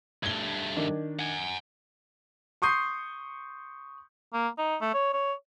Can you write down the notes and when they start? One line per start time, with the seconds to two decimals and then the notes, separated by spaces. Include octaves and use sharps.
0.23 G2 A3 G#6 G7
0.77 D#3 D4
1.19 F#5 G#5
2.62 C6 C#6 D#6 G6 C7
4.34 A#3
4.58 D#4
4.81 A3
4.94 C#5
5.13 C#5